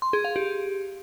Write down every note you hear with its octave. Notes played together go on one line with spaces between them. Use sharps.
C6
G#4
F5
G4